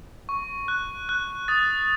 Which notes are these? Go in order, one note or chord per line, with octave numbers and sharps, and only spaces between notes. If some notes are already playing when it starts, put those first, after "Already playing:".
C#6
F#6
F#6
D#6 A6